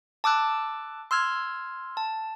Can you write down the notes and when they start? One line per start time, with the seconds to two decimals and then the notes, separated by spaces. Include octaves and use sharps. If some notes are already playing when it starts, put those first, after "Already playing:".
0.24 A5 D6 E6 F#6
1.11 C6 E6 F6 G#6
1.97 A5